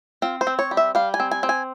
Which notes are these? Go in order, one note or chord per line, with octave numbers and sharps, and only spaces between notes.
C4 F4
C5
C4
C#5
G3
E5
G3 F5
G#5
C4
G#5
C4
G#5